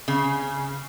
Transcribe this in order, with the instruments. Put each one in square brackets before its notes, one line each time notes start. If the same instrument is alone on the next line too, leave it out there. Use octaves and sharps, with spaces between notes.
[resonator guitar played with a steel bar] C#3